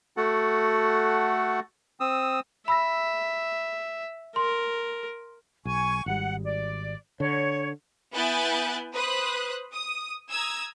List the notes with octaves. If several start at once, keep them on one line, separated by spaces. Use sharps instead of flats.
A3 F#4 A4 F#5
C4 D#6 E6
E5 B5 E6 A#6
A#4 C6
B1 G#5 C#6
G#1 G3 F#5
D5
D3 C#5
B3 E4 G#5 F#6 G6 A6
B4 C5 D#6 F#6
D#6
A#5 D#6 E6 G#6